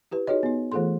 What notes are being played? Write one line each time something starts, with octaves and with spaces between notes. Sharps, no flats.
E4 G4 B4
D#4 F#4 G#4 C#5 D#5
B3 D#4
E3 A3 F4 G#4 A4 C6